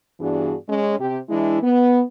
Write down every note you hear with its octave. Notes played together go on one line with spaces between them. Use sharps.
G2 E3 B3 D4 F#4 G#4
G#3 C#4
C3 G4
E3 G#3 D4 E4
B3